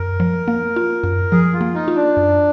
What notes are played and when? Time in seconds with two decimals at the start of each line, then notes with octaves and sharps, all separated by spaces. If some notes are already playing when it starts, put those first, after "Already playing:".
Already playing: F#2 A#4
0.20 F3
0.48 A#3
0.76 F4
1.04 F#2
1.32 F3 G#4
1.54 F4
1.61 A#3
1.74 D#4
1.88 F4
1.96 D4
2.17 F#2